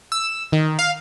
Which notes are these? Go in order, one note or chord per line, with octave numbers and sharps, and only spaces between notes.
E6
D#3
F5